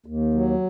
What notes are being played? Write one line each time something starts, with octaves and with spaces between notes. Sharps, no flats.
D#2
F#3